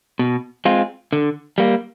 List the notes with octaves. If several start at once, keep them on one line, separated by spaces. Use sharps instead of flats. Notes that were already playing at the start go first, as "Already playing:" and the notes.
B2
G#3 C4 F4
D3
G3 A#3